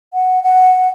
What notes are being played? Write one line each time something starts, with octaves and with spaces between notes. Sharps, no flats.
F#5
F#5